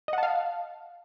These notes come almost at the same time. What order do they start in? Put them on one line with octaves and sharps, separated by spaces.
D#5 F#5 A5 F5